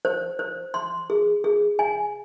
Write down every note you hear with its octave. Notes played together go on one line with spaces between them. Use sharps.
C5
C5
C6
G#4
G#4
G#5